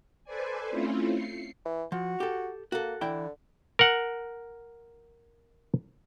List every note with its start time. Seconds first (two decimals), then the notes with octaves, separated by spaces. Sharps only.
0.24 A4 B4 C5 D5 G#5
0.70 A3 C4 C#4 E4 F4
1.13 C7 C#7
1.65 E3
1.92 F3 F#4
2.20 G4 A4
2.72 A#3 F#4 A4
3.01 D3 E3 E4 G5
3.79 A#4 F#5